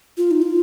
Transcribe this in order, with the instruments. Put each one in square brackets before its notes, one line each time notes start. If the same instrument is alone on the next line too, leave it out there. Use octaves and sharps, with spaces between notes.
[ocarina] F4
D#4
F4